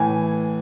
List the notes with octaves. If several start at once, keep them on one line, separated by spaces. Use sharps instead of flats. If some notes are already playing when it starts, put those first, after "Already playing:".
Already playing: A2 E3 G#5